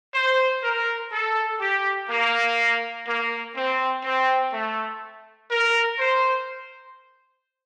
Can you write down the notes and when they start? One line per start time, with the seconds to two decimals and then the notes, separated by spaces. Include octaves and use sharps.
0.14 C5
0.63 A#4
1.12 A4
1.60 G4
2.09 A#3
3.07 A#3
3.55 C4
4.04 C4
4.53 A3
5.51 A#4
6.00 C5